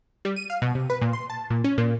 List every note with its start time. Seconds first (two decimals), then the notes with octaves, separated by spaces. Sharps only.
0.25 G3
0.36 D#7
0.50 F5
0.62 B2
0.75 C3
0.90 B4
1.01 A#2
1.13 C6
1.30 A5
1.50 A#2
1.64 C#4
1.78 A#2